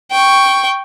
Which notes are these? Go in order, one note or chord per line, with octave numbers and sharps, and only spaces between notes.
G5 C#6